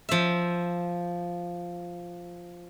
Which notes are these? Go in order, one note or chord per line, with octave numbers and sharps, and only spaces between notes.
F3 E5